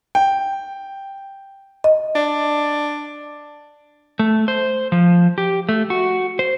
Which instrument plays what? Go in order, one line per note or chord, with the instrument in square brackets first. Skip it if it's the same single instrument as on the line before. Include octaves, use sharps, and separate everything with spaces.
[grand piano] G5
[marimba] D#5
[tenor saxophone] D4
[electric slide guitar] A3
C5
F3
G4
A3
F#4
C5